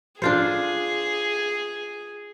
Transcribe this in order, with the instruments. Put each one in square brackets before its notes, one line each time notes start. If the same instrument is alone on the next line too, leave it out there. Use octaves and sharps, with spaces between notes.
[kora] D4 F4 C5 [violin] G#4